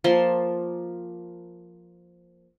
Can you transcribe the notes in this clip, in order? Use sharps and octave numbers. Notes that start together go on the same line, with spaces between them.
F3 A#3 A5 C6